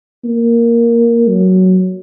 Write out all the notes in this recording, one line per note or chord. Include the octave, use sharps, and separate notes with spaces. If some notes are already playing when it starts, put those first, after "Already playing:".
A#3
F#3